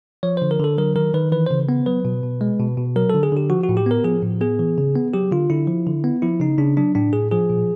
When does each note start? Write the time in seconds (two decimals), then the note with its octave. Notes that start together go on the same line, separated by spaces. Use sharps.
0.23 F3 C#5
0.37 D3 C5
0.51 A#4
0.60 D3 A4
0.78 F#3 A#4
0.96 D#3 A#4
1.14 D#3 B4
1.32 E3 B4
1.47 C#3 C5
1.69 B3
1.86 F#3 B4
2.05 B2
2.24 B2
2.41 G#3
2.59 B2
2.78 B2
2.96 F#3 A#4
3.10 D3 A4
3.23 G#4
3.32 D3 G4
3.50 F3 F#4
3.64 F#4
3.69 A2
3.77 G4
3.86 B3 A#4
4.04 F3 G#4
4.23 A2
4.41 B3 G#4
4.59 E3
4.78 C#3
4.96 B3
5.13 F#3 G4
5.31 D3 F4
5.50 D3 E4
5.67 F3
5.87 D3
6.04 B3
6.22 F3 E4
6.40 C#3 D#4
6.58 C#3 D4
6.77 F#3 D4
6.95 A2 D4
7.13 A2 G#4
7.31 F3 G#4
7.50 A#2